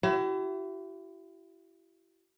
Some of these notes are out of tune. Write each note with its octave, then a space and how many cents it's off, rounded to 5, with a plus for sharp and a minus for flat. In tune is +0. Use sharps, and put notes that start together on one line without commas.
E4 +30 G4 -45